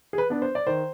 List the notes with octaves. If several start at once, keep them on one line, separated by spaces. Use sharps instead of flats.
G#4
B4
B3 D4
C5
D5
D#3 C5